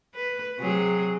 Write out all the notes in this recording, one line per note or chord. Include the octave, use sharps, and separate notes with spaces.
B4
C3 F#3 G#4